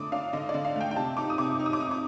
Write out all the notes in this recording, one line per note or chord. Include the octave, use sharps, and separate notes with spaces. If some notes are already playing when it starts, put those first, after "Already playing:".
Already playing: D3 A3 D6 D#6
D4 F5
D3 D#5
D5
D3
F5
A3 G5
G5
C3 A5
D#4 D6
D#6
C3 D6
D#4
D#6
D6
D#4 D#6
D6